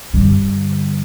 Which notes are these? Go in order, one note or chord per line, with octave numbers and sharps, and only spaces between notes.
G2 D3